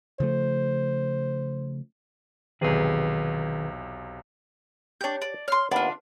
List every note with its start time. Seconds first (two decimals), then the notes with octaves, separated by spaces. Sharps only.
0.20 C#3 F3 A3 C5
2.61 B1 E2 C3 D#3 G#4 B4
5.01 D4 G4 C#5 G6
5.22 D5
5.48 C#5 C6 F6
5.71 D#2 B3 D4 F4